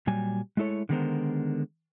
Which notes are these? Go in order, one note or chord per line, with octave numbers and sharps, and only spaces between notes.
A#2 F#3 G3 G#5
G#3 A3 E4 A4 C#5
D3 D#3 G#3 B3 A#4 C5